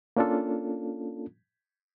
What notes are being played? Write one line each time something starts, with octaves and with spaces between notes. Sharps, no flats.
A#3 C#4 D4 F4 A4